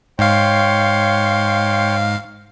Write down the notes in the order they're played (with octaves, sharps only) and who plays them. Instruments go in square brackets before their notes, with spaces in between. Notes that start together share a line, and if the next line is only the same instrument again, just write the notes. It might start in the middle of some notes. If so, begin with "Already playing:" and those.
[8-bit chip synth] G#2 F5 [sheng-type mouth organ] C#5 G5 C6